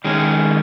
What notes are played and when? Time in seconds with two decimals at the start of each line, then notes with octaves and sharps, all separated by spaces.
0.04 D#3 G#3 C#4